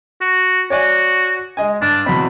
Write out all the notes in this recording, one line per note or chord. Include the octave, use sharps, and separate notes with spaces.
F#4
F#4 C#5 D5 G#5
G#3 D#5 G#5
G2 D4
E2 B2 C4 B5